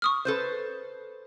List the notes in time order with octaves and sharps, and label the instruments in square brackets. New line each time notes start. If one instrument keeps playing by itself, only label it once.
[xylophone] C#6 D#6 F6
[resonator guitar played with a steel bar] A4 B4 C5